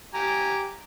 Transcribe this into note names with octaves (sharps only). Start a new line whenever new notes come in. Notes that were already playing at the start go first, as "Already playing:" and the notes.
G4 G#5 A#5